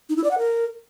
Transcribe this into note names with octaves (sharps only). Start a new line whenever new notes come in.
D#4
E4
D5
F#5
A#4